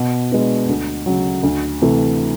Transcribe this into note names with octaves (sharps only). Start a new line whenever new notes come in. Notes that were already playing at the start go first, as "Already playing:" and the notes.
Already playing: B2
G#3 B3 D4
D2
C#3 F#3
D2
C3 E3 A3